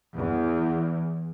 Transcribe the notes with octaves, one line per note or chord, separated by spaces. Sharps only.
E2